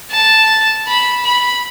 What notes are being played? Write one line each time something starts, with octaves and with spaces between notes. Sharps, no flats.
A5
B5
B5